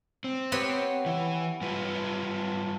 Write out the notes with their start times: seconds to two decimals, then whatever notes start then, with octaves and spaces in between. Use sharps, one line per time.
0.24 C4
0.52 B3 G4 C#5
1.06 E3 E4
1.61 G3 F4 B4